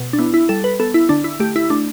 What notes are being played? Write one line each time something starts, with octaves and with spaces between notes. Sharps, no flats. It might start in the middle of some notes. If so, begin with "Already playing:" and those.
Already playing: B2
D4
B3 E4
E4
G3 A4
B4
B3 A4
E4
D3 D4
E4
A3 G4
E4
A3 D4